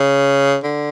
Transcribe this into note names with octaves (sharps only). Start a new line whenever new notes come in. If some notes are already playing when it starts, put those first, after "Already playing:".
Already playing: C#3
D3